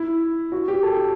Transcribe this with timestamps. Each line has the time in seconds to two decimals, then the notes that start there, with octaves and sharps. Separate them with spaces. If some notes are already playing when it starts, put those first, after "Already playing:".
Already playing: E4
0.52 F#4
0.68 G4
0.83 A4